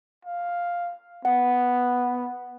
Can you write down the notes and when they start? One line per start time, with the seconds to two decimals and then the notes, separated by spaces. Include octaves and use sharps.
0.25 F5
1.25 B3 F#5